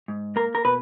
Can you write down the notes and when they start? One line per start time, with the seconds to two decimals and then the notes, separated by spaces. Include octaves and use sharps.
0.08 G#2
0.36 A#3 A#4
0.55 A#4
0.65 B2 B4